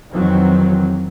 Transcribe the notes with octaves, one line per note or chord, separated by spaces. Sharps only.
F2 D#3 E3 F#3 C4